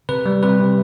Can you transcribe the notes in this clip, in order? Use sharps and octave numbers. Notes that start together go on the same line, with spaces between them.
C3 B4
G3
C3 B4
C3